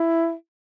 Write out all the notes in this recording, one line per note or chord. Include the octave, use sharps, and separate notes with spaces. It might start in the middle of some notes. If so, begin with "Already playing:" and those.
Already playing: E4